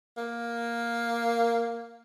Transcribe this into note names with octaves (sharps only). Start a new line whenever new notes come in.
A#3